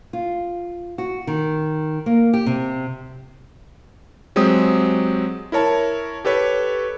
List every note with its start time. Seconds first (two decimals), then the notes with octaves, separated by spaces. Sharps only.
0.13 F4
0.98 F#4
1.27 D#3
2.06 A#3
2.33 G4
2.46 C3
4.36 F#3 G#3 C4 G4 D#6
5.52 E4 A#4 C#5 A5
6.25 G4 A4 B4 C#5